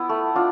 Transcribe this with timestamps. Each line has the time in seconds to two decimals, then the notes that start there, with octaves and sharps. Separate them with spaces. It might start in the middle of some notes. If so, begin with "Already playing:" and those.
Already playing: B3 E4
0.09 A3
0.36 D4 F4